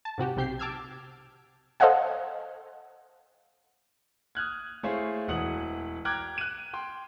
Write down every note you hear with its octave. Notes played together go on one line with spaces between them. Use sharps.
A5
G#2 C3 F#4 G4
B1 C3 G4 G6 C7
A5 D6 E6 F6 G#6
A4 C5 D#5 F5 F#5 G#5
D#6 F6 F#6 G#6
A3 E4 G#4 C5 C#5 F5
E1 E3 F#5 D#6 F#7
G5 A#5 D6 F6 F#6 G#6
F#6 D#7
G5 C6